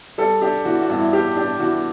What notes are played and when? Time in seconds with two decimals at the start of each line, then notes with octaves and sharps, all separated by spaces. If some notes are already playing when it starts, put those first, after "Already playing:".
0.18 G3 A4
0.42 D4 G4
0.65 E3 F#4
0.82 F#4
0.89 G2
0.97 E4
1.13 G3 G4
1.36 D4 G4
1.60 E3 F#4